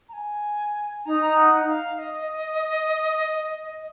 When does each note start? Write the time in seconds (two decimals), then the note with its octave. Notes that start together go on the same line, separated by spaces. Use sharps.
0.09 A#5
0.13 G#5
1.06 D#4 A#5
1.37 F#5
1.68 F5
1.99 D#5